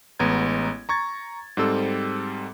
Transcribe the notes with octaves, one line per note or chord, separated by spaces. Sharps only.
A1 G#3 B3 A#5 G#6
A#5 C#6 G#6 A6
G#2 G3 C4 A4 E6